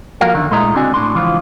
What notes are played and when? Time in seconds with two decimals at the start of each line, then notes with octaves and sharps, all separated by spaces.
0.21 F3 A#3 F#4 A#4 F5
0.34 E2 D3 D#3
0.51 A#2 G#3 A3 E4 D#5 A#5
0.75 C#2 D3 C4 D4 F#4 G#5
0.94 A2 D4 C6
1.14 C#2 E3 F3 F4